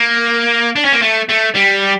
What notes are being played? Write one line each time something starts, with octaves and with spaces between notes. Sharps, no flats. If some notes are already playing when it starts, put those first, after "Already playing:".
Already playing: A#3
D4
C#4
A#3
A3
A3
G3